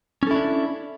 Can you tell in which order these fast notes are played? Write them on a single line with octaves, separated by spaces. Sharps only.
C#4 A4 E4 D4